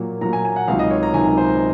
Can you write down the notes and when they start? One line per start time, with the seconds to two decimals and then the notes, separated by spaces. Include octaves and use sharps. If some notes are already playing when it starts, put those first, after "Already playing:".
Already playing: A#2 F#3 A#3
0.21 A#2 F#3 A#3 A#5
0.33 G#5
0.45 G#5
0.56 F#5
0.68 C#2 C3 D#3 F#3 F5
0.79 D#5
0.91 C#5
1.03 A#5
1.14 C#2 C3 D#3 F#3 G#5
1.38 C5